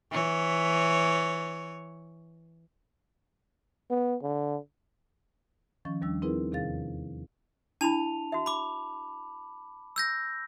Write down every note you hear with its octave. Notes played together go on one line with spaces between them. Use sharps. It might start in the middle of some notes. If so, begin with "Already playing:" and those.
E3 C#5
B3
D3
D#3 F3 C#4 C#6
D#2 F3 G3 D4 E6
C4 D#4 E4 G#4 A#4 B4
E2 C3 D#3 G#4 F5 A6
D4 E4 A5 B5 F7
F#4 E5
B5 D6
E6 G6 A#6